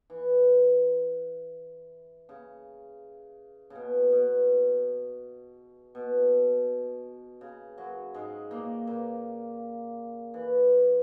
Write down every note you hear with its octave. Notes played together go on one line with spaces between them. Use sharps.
E3
C#3
C#3
B2
B2
B2
C#3
F#2 F#3
G#2 G#3
A#2 A#3
A#2 A#3
E3